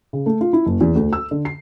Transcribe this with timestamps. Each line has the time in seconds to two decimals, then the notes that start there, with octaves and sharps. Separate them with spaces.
0.13 C#3
0.26 A3
0.41 F4
0.53 E4
0.66 F#1
0.81 E2
0.95 D2
1.13 E6
1.31 D3
1.45 C7